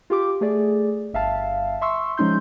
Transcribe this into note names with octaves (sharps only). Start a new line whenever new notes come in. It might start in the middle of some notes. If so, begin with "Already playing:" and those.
F4 G4 D6
A3 G#4 D5
G1 E5 F5 A5
E5 C6 C#6 E6
F3 G#3 C#4 D#4 C6 G6